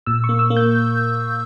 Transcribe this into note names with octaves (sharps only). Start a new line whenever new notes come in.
A#2 E6
C#6
A#3
E6
A#3
G6